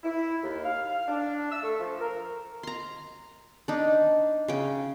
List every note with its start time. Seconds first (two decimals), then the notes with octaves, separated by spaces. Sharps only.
0.03 E4
0.43 D#2
0.64 F5
1.08 D4
1.50 E6
1.63 A3
1.80 F3
2.00 A#4
2.63 A#5 C6
3.68 D4 D#4
4.48 C#3 G5